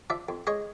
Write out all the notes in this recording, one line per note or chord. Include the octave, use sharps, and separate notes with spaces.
F3 D5 E5
F2
G#3 C#5 D#5